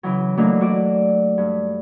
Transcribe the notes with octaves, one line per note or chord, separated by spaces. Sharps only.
C#3 E3 F#3
E3 F#3 A3 A#3 D4 D#4
F#4 D5
G2